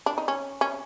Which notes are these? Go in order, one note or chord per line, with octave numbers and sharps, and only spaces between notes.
D4
D#4
C#4
C#4